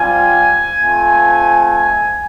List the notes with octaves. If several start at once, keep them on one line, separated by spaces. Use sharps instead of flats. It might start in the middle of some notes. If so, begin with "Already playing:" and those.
Already playing: G3 C4 F4 G#5
A3 C4 F4